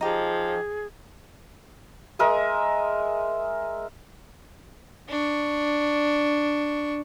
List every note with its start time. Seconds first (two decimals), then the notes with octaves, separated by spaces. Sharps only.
0.01 F3 D#4 G4 G#4
2.19 G#3 A#4 E5 D#6
5.09 D4 C#6